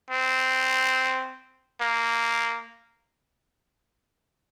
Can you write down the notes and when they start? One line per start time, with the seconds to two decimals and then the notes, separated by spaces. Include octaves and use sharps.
0.10 C4
1.81 A#3